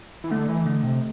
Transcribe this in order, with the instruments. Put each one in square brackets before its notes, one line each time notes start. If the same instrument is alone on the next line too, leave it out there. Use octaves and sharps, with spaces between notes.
[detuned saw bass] E3
[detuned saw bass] D3 [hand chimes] A3
[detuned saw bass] E3
[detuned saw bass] D3 [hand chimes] A3
[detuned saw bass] C3